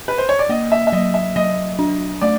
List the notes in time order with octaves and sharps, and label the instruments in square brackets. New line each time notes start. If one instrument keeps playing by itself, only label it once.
[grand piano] B4
C5
C#5
D5
[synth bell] A#3 [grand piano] D#5
[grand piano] E5
E5
[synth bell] F#3 [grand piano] D#5
[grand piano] E5
[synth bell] F#3 [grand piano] D#5
[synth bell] D4
[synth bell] A3 [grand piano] D5